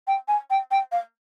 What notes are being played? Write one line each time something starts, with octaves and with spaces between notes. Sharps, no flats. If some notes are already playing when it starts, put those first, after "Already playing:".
G5
G#5
G5
G5
F5